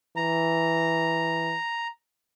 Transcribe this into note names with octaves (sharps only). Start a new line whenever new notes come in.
E3 A#5